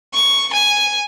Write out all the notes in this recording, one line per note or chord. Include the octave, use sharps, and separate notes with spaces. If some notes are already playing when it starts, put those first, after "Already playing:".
C#6
G#5